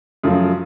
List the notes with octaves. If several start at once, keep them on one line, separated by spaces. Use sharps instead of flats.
F#2 C#3 F3 A3